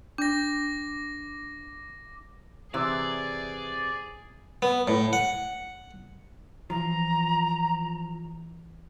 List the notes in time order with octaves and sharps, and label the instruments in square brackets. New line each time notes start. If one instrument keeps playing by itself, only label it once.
[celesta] D4 [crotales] D6 A#6
[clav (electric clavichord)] C3 [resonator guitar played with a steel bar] E3 [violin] G#4 [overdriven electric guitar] D5
[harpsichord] B3
A2
F#5
[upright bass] E3 [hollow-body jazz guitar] F3 [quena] A#5